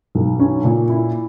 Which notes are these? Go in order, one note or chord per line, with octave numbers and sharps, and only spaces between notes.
B1
C#4
A#2
E4